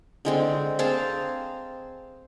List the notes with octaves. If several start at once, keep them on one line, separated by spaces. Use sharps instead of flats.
D3 G#3 C4
C4 G#4 F5 A5